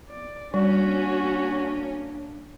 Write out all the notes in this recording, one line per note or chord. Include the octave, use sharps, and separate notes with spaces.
D5
G3 A#3 C#4 D4 F#4